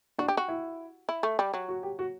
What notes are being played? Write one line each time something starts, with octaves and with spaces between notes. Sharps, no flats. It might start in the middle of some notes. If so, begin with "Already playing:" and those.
D4 F#4
G4
F#4
E4
E4
A3
G3
F#3
F#4
G4
F#4